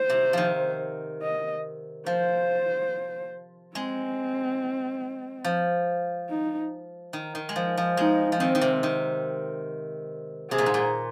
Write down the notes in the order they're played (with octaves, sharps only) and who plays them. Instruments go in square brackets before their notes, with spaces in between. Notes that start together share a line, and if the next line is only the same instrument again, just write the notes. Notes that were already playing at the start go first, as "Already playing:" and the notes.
Already playing: [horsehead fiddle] C5
[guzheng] C3
D#3 F3
[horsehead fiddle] D#5
[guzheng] F3 [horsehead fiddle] C5
[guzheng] G#3 [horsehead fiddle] C4
[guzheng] F3
[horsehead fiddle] D#4
[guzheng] D#3
D#3
G#3
F3
F3
[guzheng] G#3 [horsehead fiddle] D#4
[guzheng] F3
[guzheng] D#3 [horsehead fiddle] C4
[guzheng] D#3
C3
D#3
[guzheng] C3 [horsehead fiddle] G#4
[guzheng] A#2
G#2
A#2